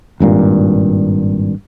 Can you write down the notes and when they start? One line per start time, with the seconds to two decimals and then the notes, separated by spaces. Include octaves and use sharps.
0.20 G#1 G2 A#2